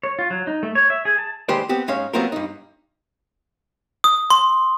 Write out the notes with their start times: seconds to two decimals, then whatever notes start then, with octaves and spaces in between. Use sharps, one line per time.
0.03 C#5
0.19 F4
0.30 F#3
0.47 D#4
0.63 A3
0.75 C#5
0.90 E5
1.05 G#4
1.18 A5
1.49 D#3 G#3 G4 B4 C5 D5
1.69 B3 C4 G4
1.88 G#2 G#3 C#4 C#5 F5
2.13 F#3 G3 B3 C4 F4 A#4
2.32 G2 D#4
4.04 D#6
4.30 C6